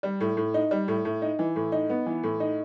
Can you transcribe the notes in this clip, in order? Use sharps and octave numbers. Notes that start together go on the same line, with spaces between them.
G3
A2
A2
D#4
G3
A2
A2
D#4
E3
A2
D#4
B3
E3
A2
D#4